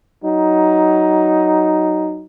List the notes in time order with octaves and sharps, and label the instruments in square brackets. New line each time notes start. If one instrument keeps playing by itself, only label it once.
[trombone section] F#3 D#4